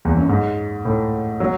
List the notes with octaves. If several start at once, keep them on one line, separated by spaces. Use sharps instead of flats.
E2
F#2
G#2
A2
F#3